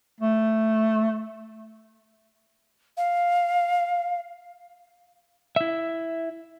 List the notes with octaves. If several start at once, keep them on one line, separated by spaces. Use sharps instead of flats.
A3
F5
E4 E5